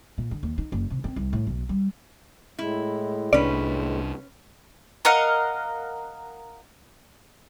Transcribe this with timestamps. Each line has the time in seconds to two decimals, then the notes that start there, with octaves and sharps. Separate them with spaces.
0.18 A#2
0.31 D3
0.43 D#2
0.58 D#4
0.72 F#1
0.90 C3
1.04 C4
1.16 C2
1.33 A2
1.47 B1
1.69 G3
2.59 A2 G#3 E4
3.33 C2 C#4 D4 B4 D5
5.05 A#4 D#5 F5 F#5